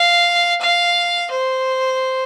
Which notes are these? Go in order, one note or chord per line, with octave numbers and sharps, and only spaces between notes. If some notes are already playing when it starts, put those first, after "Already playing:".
Already playing: F5
F5
C5